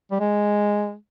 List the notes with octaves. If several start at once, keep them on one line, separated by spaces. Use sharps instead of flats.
G3
G#3